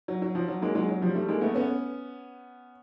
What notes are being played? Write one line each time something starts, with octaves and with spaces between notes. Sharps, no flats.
F#3
F#3
F3
F#3
G#3 A#3
F#3 G#3
F#3
F3 G3
G3 A3
G#3 A#3
A3 B3
B3 C#4